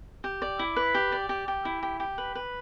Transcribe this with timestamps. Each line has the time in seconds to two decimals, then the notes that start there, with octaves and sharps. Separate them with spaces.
0.24 G4
0.42 D5
0.59 E4
0.76 B4
0.95 G4
1.12 D5
1.29 G4
1.48 G4
1.65 E4
1.83 G4
2.00 G4
2.18 B4
2.35 B4